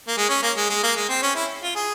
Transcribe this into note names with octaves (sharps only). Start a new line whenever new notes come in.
A#3
G#3
C#4
A#3
G#3
G#3
A#3
G#3
C4
C#4
E4
F4
G#4